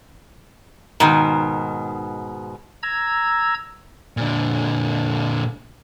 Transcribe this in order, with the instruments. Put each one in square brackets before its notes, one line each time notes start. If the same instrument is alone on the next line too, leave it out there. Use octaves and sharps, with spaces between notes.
[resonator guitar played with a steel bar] G#2 B2 D#3
[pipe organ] A#5 E6 G#6
[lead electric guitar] A#2 D3